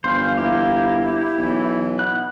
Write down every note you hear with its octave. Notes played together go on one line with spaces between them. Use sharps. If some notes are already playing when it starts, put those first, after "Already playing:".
G1 E3 C5 F5
A#3 E4 G4
B1 E3
B3 F#6